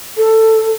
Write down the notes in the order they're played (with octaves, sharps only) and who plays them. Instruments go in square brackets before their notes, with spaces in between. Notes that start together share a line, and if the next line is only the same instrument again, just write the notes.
[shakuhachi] A4